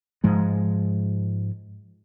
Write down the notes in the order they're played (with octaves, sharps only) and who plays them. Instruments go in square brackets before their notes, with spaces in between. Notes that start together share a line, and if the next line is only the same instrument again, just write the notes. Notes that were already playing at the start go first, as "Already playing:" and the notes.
[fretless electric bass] G#2 F3 G#3